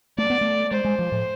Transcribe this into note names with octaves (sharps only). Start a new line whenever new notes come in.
A3 D5
B3
A3
G#3 C5
G#3
F3
A2